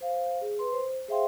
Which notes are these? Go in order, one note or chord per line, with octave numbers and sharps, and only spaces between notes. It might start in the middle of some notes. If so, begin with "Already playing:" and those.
C5 F5
G#4
B4 C6
C5
G#4 C5 E5 F5 G5 C6